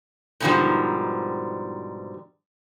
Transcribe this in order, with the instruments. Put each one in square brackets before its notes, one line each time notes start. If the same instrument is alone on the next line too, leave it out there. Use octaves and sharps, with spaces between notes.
[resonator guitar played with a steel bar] G#2 B2 D3 D#3 F3 G3